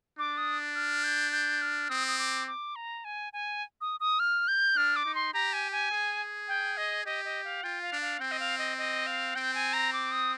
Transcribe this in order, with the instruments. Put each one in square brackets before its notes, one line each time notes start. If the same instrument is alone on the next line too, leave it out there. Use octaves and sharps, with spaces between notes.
[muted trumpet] D4 [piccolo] D6
[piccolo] D#6
F6
G6
G6
F6
[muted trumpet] C4 [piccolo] D#6
[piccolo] D#6
D6
D6
A#5
G#5
G#5
D#6
D#6
F6
G6
[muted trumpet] D4 [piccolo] F6
[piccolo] D6
[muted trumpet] D#4
[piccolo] C6
[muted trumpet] G4 [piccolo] A#5
[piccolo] G#5
G#5
[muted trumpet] G#4
[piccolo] G5
D#5
[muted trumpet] G4 [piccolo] D#5
[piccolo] D#5
F5
[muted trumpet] F4 [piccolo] G5
[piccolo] F5
[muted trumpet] D4
[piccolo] F5
[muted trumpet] C4 [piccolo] G5
[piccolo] D#5
F5
D#5
D#5
F5
[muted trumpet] C4 [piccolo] G5
[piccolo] G#5
A#5
D6
D#6